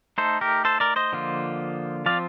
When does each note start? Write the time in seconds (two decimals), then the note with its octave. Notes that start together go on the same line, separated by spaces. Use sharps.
0.18 A3 D#4 A4 C5
0.41 G4 A#4
0.65 A4 C5
0.80 A#4 D5
0.96 C5 D#5
1.12 D3 F3 A#3 F4
2.06 F3 C4 F4 D5 F5